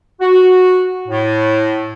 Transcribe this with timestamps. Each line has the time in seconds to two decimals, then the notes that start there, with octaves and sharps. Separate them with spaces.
0.20 F#4
1.08 A2